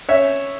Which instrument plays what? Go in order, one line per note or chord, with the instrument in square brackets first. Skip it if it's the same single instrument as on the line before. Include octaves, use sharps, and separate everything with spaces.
[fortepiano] C#4 C#5 E5